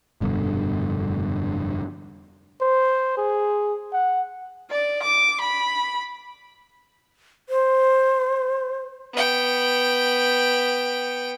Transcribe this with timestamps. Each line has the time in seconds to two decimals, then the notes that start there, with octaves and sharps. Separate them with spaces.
0.21 F1 G2 B2 D3
2.61 C5
3.17 G#4
3.93 F#5
4.70 D5
5.03 D6
5.41 B5
7.49 C5
9.13 B3 G5